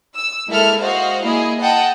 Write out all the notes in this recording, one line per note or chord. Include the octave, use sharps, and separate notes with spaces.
E6
G#3 A#3 E4 A4 E5 F6
F#4 C5 D#5 F5
A#3 E4 G#4 D#5
D#5 F#5 G5 A5